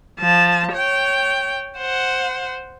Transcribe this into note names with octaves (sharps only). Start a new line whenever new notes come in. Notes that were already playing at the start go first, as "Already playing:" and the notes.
F3 A5
C#5 G5
C5 F#5